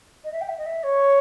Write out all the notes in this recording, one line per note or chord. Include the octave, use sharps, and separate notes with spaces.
D#5
E5
G5
E5
D#5
E5
C#5